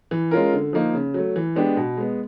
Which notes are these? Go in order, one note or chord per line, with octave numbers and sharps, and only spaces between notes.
E3
G#3 C#4 F4 A#4
D3
F3 A#3 D#4
C#3
F#3 A3
E3
G#3 B3 D4 G4
B2
G#3 B3